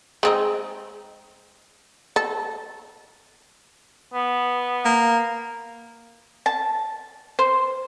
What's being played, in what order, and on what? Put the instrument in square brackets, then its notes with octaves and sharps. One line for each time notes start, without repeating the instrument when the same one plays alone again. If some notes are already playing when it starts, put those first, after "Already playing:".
[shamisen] G#3 C4 D#4
A4
[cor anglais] B3
[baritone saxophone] A#3
[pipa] A5
C5